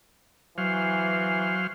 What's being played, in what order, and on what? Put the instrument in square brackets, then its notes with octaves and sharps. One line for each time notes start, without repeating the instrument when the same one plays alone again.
[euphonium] E3 [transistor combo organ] F#3 C5 F5